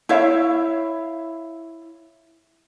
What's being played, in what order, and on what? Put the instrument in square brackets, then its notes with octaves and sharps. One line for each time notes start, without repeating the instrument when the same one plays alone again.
[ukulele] E4 C#5 E5 F5